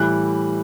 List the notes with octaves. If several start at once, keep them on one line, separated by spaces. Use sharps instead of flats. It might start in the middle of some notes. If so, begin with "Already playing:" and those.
Already playing: A2 E3 G3 F#6